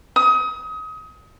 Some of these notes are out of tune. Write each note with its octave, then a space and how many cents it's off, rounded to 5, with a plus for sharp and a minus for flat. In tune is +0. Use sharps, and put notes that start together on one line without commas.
D#6 +30